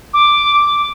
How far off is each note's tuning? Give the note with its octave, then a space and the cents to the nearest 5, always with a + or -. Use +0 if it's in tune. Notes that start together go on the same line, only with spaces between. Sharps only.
D6 +0